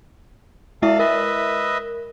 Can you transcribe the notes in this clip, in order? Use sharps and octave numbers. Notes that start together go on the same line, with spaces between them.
G#3 E4 A4 E5 F5
A#4 B4 D#5 E5